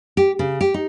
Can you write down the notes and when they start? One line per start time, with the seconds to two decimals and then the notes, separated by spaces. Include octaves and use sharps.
0.17 G4
0.39 C#3
0.61 G4
0.74 D#4